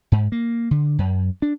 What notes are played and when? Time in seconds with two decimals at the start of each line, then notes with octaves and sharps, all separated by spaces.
0.12 G#2
0.32 A#3
0.71 D3
0.98 F#2
1.42 D4